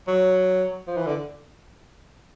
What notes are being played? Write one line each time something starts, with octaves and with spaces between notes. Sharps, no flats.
F#3
F3
E3
D3